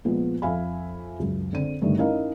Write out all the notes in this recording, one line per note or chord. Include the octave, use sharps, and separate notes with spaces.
A#2 F3 G#3 B3
F2 E5 F5 G#5 B5
C#2 F#2
D3 C4 D#7
G2 D3 D#3 A3
C#4 D#4 E4 A#4 D#5 F5